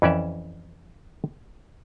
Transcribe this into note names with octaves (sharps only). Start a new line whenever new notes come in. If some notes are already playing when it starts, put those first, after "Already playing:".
F2 E3 C#4 D5 E5